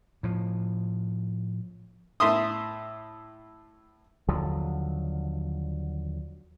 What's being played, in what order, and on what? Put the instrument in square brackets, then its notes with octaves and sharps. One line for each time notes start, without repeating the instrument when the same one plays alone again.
[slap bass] A2 F3
[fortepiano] A2 E5 C6 D#6
[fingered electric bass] D#2 D3 F3 F#3